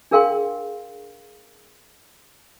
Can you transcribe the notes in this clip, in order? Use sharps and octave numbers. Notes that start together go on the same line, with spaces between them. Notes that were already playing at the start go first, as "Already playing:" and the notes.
D4 G#4 A#4 F5 G5 C6